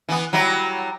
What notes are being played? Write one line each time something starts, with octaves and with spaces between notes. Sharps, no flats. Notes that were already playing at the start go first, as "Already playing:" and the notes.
E3 B3
F#3 G3 E4